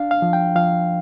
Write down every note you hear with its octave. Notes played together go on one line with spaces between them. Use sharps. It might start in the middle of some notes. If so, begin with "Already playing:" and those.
Already playing: D4 F5
F5
F3
G5
F3 F5